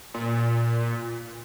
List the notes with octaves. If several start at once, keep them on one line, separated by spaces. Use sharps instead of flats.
A#2